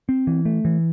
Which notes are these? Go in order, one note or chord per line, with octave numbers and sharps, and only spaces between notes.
C4
E3
A3
E3